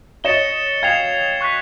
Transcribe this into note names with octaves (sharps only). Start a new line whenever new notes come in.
C#5 D#5 A6 C#7 E7 G7
F5 G5 G#6 C7 F7
C#6 F#6 B6